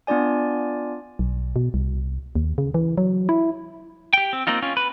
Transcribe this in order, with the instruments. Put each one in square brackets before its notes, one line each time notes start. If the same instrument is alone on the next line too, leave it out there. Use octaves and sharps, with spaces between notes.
[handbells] B3 D4 F4 D5 G#5
[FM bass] B1
B2
C2
D#2
C#3
E3
F#3
E4
[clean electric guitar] G4 G5
C4
A#3 C4 D#4 F4
C#4 F4
B4